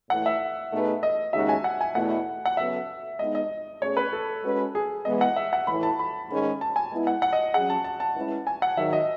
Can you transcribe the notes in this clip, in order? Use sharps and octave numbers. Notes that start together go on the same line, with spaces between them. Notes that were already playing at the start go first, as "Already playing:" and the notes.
A2 E3 A3 E4 F#5
E5
B2 A3 D#4 G#4 B4
D#5
D#2 C#3 G#3 D#4 F#4 E5
G#5
F#5
G#5
E2 B2 A3 E4 F#5
F#5
C#3 F#3 B3 F#4 A4 E5
G#3 B3 D#4 D#5
D#5
B2 A3 C#4 G#4 C#5
B4
A4
G#3 C#4 F#4 B4
G#4
E3 G#3 B3 D#5
F#5
E5
F#5
A2 E3 A3 E4 B5
A5
B5
G#2 D#3 G#3 C#4 G#4
A5
G#5
G#3 B3 E4
F#5
F#5
D#5
F#3 C#4 G#4 F#5
A5
A5
A5
G#3 C#4 E4 B4
G#5
F#5
G#2 D#3 F#3 E5
D#5